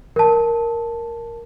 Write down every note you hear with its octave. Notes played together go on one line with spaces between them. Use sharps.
A#4 A5